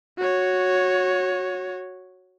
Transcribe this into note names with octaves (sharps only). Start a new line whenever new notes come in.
F#4 C#5